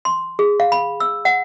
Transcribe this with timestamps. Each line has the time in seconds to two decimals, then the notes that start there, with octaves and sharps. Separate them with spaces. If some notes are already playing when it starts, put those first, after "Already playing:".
0.05 C6
0.39 G#4
0.60 F5
0.72 B5
1.00 E6
1.25 F#5